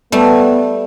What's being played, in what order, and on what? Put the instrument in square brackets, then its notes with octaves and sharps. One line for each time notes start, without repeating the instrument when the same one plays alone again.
[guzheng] G3 A3 [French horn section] B3